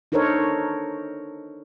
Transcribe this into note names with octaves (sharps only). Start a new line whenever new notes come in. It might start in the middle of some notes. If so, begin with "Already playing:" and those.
D4 D#4 A4 A#4 C5 C#5